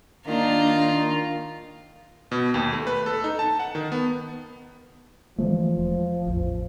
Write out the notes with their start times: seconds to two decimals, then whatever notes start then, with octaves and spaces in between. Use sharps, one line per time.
0.27 D#3 A#3 D4 F4 A#5
2.32 B2
2.54 D#2
2.73 A3
2.87 B4
3.06 A4
3.24 D#4
3.39 A5
3.59 F#5
3.75 D#3
3.92 B3
5.38 E3 F3 G#3 A3
5.77 E1
6.26 E1 A1 E2